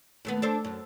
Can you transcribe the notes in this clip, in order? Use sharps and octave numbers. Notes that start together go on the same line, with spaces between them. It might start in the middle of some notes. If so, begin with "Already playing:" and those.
D#2 A3 B3
D4 A4 C5
F#2